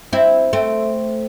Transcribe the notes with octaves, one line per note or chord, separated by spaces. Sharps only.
C4 E4
A3 C4